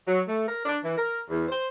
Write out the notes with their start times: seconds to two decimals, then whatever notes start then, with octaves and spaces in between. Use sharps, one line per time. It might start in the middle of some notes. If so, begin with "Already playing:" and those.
0.08 F#3
0.28 A3
0.47 A#4
0.66 D4
0.83 E3
0.97 A#4
1.30 E2
1.49 C5